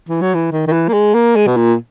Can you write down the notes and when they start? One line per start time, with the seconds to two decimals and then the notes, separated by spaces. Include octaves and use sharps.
0.09 E3
0.22 F#3
0.34 E3
0.51 D#3
0.67 D#3
0.72 E3
0.88 A#3
0.93 G#3
1.14 A#3
1.36 G#3
1.47 B2
1.56 A#2